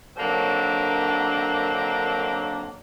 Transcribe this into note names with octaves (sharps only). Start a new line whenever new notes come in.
D3 D#3 F#3 A#3 C4 D4